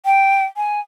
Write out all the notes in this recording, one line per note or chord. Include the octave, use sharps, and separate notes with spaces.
G5
G#5